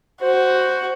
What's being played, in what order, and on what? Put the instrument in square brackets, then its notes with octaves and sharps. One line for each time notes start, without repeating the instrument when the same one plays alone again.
[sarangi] F#4 [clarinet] C5